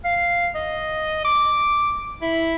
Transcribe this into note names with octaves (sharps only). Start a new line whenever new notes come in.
F5
D#5
D6
E4